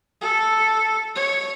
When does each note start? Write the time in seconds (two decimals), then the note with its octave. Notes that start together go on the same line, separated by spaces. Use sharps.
0.21 A4
1.16 C#5